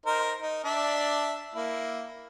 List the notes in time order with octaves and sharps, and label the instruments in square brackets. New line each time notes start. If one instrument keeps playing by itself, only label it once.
[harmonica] D#4 A#4 C5
D#4
D4 D5 E5
A#3 E4